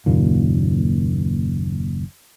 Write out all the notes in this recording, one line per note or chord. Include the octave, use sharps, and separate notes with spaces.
F#1 D#2 A#2